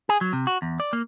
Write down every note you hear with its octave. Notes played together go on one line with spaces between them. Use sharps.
G#4
F#3
C3
F#4
E2
D5
A#3